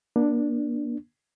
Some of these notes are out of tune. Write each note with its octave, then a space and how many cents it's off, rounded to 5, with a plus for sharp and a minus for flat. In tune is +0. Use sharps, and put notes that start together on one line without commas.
A#3 +35 D4 +0